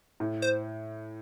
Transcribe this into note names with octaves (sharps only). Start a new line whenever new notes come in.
A2
C5